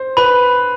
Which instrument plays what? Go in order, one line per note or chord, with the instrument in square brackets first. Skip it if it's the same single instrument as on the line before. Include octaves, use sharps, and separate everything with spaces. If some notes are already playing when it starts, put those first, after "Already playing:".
Already playing: [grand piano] C5
[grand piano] B4 [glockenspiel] B5